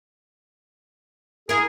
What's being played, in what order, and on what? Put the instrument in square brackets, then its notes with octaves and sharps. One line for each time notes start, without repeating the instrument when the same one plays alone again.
[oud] E4 A#4 [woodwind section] G#4